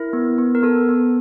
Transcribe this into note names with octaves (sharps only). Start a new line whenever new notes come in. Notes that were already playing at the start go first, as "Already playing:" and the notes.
Already playing: E4 A#4
B3
B3
A#4
B3 A4
B3